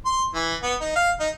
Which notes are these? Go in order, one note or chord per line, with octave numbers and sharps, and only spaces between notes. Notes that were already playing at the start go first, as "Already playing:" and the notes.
C6
E3
B3
D#4
F5
D#4